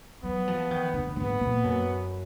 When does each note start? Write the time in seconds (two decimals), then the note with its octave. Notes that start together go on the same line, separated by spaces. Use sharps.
0.24 F#3 B3
0.48 F3
0.71 D#3
0.93 D3
1.08 F#2
1.16 G#2 B3
1.41 A#2
1.64 F#2